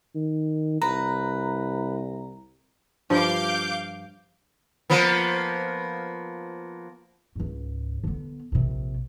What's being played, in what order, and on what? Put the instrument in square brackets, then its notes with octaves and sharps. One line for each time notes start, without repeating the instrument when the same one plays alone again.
[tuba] D#3
[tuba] C2 [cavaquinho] B4 [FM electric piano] A#5
[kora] G2 F3 [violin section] F5 D6 G6
[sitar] F3 A#3 B3
[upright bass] C#2 G#2
D3 B3
A#1 C3